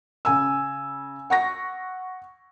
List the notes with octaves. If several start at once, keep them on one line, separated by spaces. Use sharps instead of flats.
C#3 G#5 E6
F#5 C#6 A#6